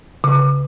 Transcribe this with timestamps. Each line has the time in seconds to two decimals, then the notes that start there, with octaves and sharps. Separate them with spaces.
0.24 C#3